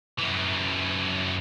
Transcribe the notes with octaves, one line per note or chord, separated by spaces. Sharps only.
F#2 E3